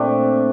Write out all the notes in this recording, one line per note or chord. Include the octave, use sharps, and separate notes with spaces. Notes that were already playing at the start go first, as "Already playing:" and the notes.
Already playing: A#2 A3 C4 D4